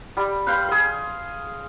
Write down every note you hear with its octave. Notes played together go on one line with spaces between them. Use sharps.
G3
B4 F5 G5 C6
G#4 C6